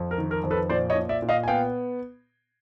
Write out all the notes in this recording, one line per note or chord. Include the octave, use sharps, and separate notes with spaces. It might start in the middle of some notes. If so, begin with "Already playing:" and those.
Already playing: F2
A#4
D#3
A#4
F2
A4 B4
A#2 C5 D5
C#5 D#5
A#2
D5 E5
A#2
D#5 F5
G#5
B3 F5 G5